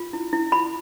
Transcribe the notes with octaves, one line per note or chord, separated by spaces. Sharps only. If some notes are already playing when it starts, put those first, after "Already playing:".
Already playing: F4
E4
E4
F4 B5